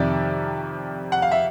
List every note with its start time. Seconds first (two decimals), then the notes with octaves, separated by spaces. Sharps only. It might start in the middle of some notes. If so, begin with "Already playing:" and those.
Already playing: F2 C3 D#3 D5 E5
1.12 F#5
1.22 F5
1.31 E5